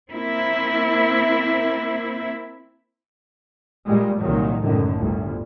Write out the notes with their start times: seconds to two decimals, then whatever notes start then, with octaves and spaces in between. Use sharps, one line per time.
0.13 A#3 C4 E4
3.86 A#2 G3 G#3
4.21 C2 A#2 D#3 F#3
4.62 C#2 F#2 A2 D3 D#3
4.94 G1 D2